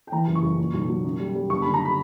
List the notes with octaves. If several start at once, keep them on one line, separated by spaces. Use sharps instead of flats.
G5
E3 A#5
F#1
C#6
F#1
A#2
B1
F#3
F#2
G3
G3
F#1 C#6
B5
D3
A#5
B5